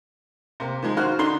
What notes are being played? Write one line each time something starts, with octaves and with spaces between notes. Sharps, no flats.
C3 A#3
D#3 F3 G#3
D#3 F4 F#4 C5 F6 F#6
D3 D#4 C6